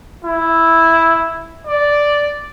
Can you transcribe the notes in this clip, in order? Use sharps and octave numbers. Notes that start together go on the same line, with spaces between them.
E4
D5